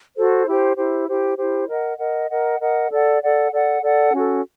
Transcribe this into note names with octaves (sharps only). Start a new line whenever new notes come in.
F#4 A4 C5
E4 G4 C5
E4 G4 C5
E4 G4 C5
E4 G4 C5
A#4 D#5 F#5
A#4 D#5 F#5
A#4 D#5 F#5
A#4 D#5 F#5
A4 D5 F#5
A4 D5 F#5
A4 D5 F#5
A4 D5 F#5
C#4 F#4 A4